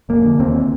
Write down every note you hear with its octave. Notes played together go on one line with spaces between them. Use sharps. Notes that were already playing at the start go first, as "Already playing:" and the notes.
F1 A#3
D3
D#2 C4